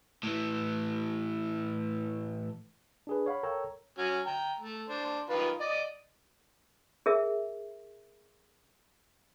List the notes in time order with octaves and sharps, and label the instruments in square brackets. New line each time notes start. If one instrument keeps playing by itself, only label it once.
[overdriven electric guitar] A2 E3
[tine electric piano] D4 G#4 B4
C#5 F5 F#5 B5
A4 A#4 C#5 G5 A#5 E6
[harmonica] F#3 C#4
G5 A#5
A3
D4 C5
D#3 F4 B4
D5 D#5
[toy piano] G#4 A#4 E5